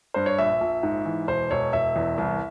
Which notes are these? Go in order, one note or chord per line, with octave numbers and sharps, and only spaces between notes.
G2 C5
C#5
A#1 E5
A#1
G#2
E3
E1 C5
E1 C#5
E1 E5
E2
C2